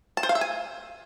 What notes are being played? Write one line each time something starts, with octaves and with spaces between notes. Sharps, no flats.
A5
C5
F5
E5
G#5